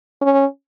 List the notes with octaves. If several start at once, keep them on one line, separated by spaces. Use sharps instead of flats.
C#4